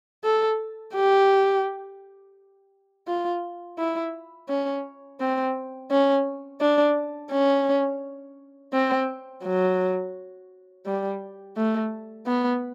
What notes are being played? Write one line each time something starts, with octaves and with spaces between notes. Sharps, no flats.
A4
G4
F4
E4
C#4
C4
C#4
D4
C#4
C4
F#3
G3
A3
B3